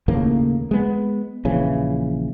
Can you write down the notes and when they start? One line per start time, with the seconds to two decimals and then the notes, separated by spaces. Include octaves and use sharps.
0.08 D#2 A2 C#3 A#3
0.71 G#3 B3
1.45 A#1 C#3 E3